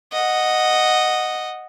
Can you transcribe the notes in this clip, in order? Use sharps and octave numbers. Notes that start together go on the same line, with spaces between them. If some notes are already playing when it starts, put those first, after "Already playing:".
D#5 F#5